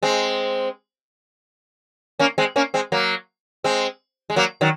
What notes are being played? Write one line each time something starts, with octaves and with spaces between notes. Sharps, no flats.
G#3 C4
A#3 C#4
G#3 C4
A#3 C#4
G#3 C4
F#3 A#3
G#3 C4
G#3
F#3 A#3
D#3 F#3